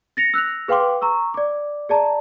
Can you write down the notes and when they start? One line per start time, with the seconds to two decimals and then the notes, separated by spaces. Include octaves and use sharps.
0.17 A6 A#6 C#7 F7
0.34 E6 F#6 A#6 F7
0.68 G#4 B4 F5 G5 C6 D6
1.01 A#5 C#6 E6
1.34 D5 D6
1.89 G#4 D5 A5 A#5